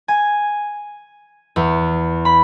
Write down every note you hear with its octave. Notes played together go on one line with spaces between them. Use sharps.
G#5
E2
B5